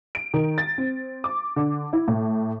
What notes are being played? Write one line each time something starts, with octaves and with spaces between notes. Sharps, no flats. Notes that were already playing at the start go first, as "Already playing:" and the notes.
D7
D#3
A6
C4
D6
D3
E4
A2